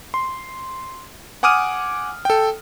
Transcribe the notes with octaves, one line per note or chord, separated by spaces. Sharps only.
C6
F#5 G#5 D6 D#6 F6 D#7
A4 G5